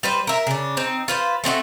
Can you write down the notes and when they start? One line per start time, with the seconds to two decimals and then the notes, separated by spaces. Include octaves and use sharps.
0.03 G3 B4 C5
0.27 A#4 E5
0.47 C#3 D4
0.77 C4 D#4
1.08 F4 B4 C5
1.44 A3 C4 D#4 F#4